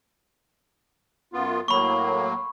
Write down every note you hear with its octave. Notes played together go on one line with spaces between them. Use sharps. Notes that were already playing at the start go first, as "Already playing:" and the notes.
F#2 B3 F4
A2 F#3 A#3 B5 C#6